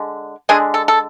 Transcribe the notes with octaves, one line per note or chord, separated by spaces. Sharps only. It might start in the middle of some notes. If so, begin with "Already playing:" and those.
Already playing: D3 G#3
D3 G#3 D4 G#4
A4
A4